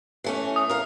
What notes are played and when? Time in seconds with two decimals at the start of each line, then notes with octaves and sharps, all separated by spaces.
0.24 E3 A3 C#4
0.56 D#6
0.70 A#4 F5